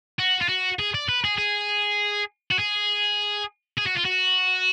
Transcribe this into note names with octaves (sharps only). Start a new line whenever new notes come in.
F#4
F4
F#4
G#4
D5
B4
G#4
G#4
F#4
G#4
G#4
F#4
F4
F#4